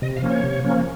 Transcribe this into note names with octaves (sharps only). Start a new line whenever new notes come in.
C3 D#5
F5
F3 A#3 C#4
C#5
C3
F3 A#3 C#4